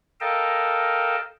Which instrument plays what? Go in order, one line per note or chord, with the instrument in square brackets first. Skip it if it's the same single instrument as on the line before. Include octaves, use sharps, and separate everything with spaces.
[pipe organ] A4 A#4 D#5 F5 G5 A5